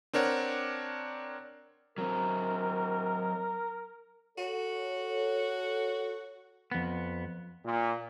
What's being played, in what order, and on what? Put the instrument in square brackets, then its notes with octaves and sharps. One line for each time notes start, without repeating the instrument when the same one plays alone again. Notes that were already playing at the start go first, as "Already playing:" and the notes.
[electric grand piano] C4 D4 A#4 C#5 F#5
[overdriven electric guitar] F#3 C4 [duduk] A#4
[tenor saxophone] F#4 [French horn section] A4 C#5
[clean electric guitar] F2 B3
[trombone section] A#2